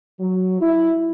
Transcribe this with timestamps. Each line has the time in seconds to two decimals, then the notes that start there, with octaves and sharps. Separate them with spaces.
0.21 F#3
0.61 E4